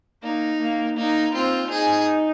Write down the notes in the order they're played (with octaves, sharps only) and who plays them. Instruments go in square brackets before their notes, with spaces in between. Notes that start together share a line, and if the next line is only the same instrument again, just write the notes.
[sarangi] A#3 [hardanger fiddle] D#4
[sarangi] A#3
[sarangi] A#3 [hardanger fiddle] D#4
[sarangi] C4 [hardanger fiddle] F4
[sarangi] D#4 [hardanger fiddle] G#4